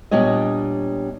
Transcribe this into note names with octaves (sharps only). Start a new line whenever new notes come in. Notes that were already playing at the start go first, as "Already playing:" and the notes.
A#2 G3 B3 D4 C#5 D#5